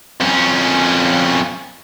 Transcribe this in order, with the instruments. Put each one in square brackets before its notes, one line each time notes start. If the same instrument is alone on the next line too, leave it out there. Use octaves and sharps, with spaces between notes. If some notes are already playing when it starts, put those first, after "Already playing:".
[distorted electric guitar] F2 C#4